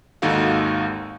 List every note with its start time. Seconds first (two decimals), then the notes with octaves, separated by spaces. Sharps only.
0.22 G#1 D#2 D#4 F#4 A4 F5